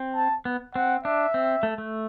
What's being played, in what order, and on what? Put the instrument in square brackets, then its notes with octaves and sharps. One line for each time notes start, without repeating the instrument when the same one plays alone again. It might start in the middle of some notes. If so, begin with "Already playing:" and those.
Already playing: [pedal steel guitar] C4
[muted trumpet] A5
[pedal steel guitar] B3
[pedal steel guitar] C4 [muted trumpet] F#5
[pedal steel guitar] D4 [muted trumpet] E5
[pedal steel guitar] C4
A3
A3